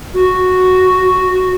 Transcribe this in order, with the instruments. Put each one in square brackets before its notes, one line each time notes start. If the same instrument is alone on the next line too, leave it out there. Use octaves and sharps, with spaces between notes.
[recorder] F#4